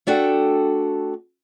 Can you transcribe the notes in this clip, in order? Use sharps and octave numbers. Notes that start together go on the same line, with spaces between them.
A3 D4 F#4 A4 G5